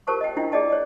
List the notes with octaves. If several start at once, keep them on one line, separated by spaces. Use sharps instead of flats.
F4 G4 A#4 C5 A5 C#6
D#5 G5
D4 E4 F4 G5
G#4 D5 D#5 A5
C#5 D5